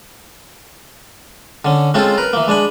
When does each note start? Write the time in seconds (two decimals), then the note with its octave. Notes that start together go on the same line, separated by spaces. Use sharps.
1.65 D3 C#4
1.94 G#3 C4 C#4 F4 A4 C5
2.18 A#4 B4
2.33 E3 A#3
2.48 G#3 D4 G#5 B5